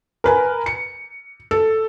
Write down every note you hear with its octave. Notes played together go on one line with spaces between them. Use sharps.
A#4 B4 G#5
C#7
A4